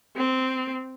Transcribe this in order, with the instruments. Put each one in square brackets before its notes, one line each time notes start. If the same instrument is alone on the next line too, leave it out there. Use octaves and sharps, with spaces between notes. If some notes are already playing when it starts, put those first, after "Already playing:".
[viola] C4